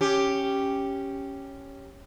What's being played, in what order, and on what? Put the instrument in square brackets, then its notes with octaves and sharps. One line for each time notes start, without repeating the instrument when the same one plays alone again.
[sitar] C#4 G4